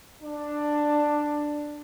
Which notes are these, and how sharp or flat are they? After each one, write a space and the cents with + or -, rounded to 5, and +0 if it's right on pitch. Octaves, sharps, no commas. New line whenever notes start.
D4 +10